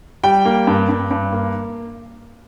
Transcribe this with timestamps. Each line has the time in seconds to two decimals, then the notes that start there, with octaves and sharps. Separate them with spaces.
0.24 G3 G5
0.45 A#3
0.67 G2
0.89 G2
1.11 G2
1.32 A#3